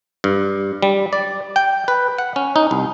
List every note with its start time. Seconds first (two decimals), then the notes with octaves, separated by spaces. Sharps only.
0.24 G2
0.83 G3
1.13 D5
1.56 G5
1.88 B4
2.18 F#5
2.36 C#4
2.56 D#4
2.71 C2